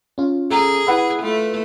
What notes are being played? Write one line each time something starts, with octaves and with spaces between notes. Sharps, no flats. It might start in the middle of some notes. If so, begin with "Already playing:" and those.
C#4 F4
G#4 A4 A#5
E4 B4 E5 F#5 B5
A3 F4